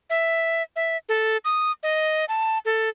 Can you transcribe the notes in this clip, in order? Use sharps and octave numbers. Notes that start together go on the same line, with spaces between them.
E5
E5
A4
D#6
D#5
A5
A4